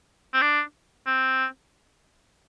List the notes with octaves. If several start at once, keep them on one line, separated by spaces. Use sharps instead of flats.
C4
D4
C4